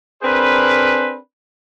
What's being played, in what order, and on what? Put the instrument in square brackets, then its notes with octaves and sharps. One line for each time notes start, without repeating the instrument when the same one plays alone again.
[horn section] C4 D4 G#4 A#4 B4